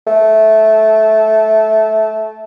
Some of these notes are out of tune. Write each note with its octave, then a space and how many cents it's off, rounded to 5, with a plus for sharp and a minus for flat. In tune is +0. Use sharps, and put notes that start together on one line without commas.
A3 -15